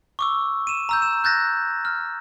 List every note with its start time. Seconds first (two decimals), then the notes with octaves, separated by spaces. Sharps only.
0.19 C#6 D6 E6
0.67 D#7 E7
0.89 A#5 E6 G6
1.02 E7
1.24 F#6 G6 A6 A#6
1.85 F6